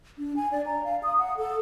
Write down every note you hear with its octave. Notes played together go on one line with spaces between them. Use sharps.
D4
G#5
D5
A#5
F5
D#6
F#5
A4